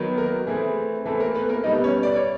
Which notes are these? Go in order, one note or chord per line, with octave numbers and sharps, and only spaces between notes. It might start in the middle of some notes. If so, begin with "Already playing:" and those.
Already playing: D#3 F#3 B3
A#3 A#4
E3 A3 C4 G#4
E3 A3 C4 A4
A#3 A#4
B3 B4
A#3 A#4
B2 G3 B3 D#4 D#5
C#4 C#5
D5
C#5